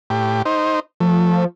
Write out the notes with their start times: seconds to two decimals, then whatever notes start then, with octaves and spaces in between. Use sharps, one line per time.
0.10 A2 G4
0.45 D#4 C5
1.00 F3 A3